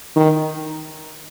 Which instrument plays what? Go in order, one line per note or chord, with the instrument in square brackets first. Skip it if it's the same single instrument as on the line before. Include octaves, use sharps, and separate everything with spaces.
[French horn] D#3